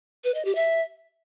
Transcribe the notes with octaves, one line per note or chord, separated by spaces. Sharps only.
B4
D#5
G4
E5